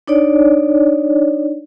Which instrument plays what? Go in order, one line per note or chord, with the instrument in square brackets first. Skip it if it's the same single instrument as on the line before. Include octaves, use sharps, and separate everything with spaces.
[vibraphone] D4 D#4 C#5 D5